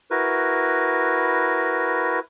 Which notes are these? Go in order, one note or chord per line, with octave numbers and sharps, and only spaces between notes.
E4 F#4 A#4 B4